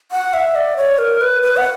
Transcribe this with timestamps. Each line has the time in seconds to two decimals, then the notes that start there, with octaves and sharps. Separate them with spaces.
0.12 F#5
0.33 E5
0.55 D5
0.77 C#5
0.98 A#4
1.21 B4
1.42 B4
1.57 F#5